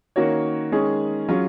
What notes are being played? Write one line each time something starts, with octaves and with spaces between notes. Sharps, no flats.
D#3 A#3 C#4 F#4 C#5
D#3 G#3 C#4 G#4
F#3 C#4 F4 G#4